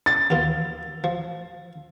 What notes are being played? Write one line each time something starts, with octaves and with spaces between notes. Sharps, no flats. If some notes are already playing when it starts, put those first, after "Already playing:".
A6
D#2 B3 F4
F3